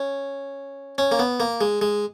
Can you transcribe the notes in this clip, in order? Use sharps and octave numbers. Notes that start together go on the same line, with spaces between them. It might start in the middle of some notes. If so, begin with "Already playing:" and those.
Already playing: C#4
C#4
A#3
B3
A#3
G#3
G#3